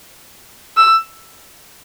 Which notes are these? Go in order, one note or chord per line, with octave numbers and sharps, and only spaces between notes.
E6